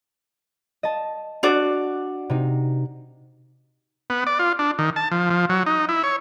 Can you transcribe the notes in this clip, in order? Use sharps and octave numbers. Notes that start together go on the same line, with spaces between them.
D#5 A5
D4 F#4 D5
C3 D#4
B3
D5
F4
D4
D#3
A5
F3
F3
F#3
D#4
E4
C#5